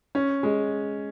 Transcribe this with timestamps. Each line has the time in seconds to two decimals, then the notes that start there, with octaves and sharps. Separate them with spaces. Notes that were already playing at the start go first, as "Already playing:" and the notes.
0.15 C#4
0.43 G#3